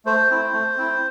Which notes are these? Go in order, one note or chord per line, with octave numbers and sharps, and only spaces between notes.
A3 C5
C4 E4
A3
C4 E4